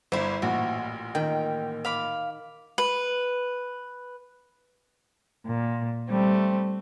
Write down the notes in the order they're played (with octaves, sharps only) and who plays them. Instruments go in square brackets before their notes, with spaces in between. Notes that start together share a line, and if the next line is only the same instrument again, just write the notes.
[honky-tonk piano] G1 [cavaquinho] E4 C5
[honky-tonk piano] A1 A#2 [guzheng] F#4
[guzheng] D#3 [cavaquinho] G5
[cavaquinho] F5 B5 D6
B4
[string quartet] A#2
G3 A3 C4